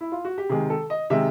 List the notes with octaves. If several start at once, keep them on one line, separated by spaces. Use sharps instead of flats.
E4
F4
F#4
G4
C3 D#3 G#3 G#4
A4
D#5
C3 D#3 G#3 E5